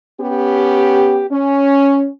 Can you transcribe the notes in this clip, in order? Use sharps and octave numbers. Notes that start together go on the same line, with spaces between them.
B3 C#4 G4
C#4